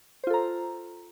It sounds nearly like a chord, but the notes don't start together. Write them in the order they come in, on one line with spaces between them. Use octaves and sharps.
C5 F4 A4 A#5